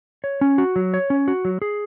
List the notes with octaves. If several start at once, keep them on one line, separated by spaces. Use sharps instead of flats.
C#5
C#4
F#4
F#3
C#5
C#4
F#4
F#3
G#4